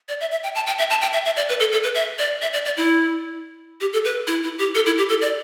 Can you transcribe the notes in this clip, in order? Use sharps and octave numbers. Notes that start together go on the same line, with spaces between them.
D5
E5
E5
G5
A5
G5
E5
A5
G5
E5
E5
D5
B4
A4
A4
B4
E5
D5
E5
D5
D5
E4
G4
A4
B4
E4
E4
G4
A4
E4
G4
A4
D5